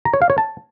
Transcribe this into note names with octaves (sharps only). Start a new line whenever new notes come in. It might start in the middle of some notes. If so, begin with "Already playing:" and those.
A#5
C#5
F5
C#5
A5